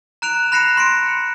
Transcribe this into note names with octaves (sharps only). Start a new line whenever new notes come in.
A#5 F#6 D7 F7
B5 F#6 A#6 C7 C#7 E7
C6 A#6 C#7 D7
C#7